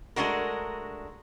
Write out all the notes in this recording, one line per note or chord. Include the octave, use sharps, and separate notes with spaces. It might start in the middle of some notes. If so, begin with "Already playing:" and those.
G#3 A3 D4 F#4 A#4